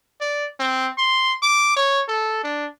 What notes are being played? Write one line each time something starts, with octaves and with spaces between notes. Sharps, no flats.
D5
C4
C6
D6
C#5
A4
D4